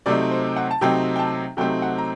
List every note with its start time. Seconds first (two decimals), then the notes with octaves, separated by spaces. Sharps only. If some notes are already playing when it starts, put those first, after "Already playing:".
0.06 C3 F#3 A3 C4 D#4 D5
0.31 C5
0.56 F#5
0.71 A5
0.81 C3 F#3 A3 C4 D#4 G5
1.16 G5
1.19 A5
1.57 C3 F#3 A3 C4 D#4 G5
1.82 F#5
1.98 A#5